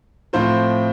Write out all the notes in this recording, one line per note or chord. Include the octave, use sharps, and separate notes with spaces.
A2 F3 C4 F4 C5